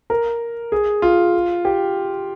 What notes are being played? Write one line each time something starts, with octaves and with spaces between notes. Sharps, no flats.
A#4
G#4
F4
G4